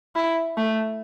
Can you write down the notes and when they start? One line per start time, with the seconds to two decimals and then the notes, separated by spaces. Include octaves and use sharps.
0.15 E4
0.57 A3